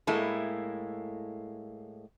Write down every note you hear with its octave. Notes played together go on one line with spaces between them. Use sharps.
A2 G#3 A#3 E4 A4